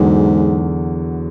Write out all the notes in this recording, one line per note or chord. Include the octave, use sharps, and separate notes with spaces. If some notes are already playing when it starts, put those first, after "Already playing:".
Already playing: E2 G#2 D3 F#3